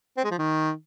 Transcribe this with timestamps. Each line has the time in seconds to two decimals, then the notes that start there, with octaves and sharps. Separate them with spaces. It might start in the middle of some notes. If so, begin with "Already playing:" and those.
0.17 C4
0.24 G#3
0.31 F3
0.38 D#3